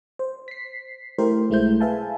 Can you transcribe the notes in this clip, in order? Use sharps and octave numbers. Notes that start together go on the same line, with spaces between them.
C5
B6 C7
A3 E4 G4 A#4 C5
B1 G#3 A3 E4 C5 G6
G#4 B4 E5 F5 G#5 A5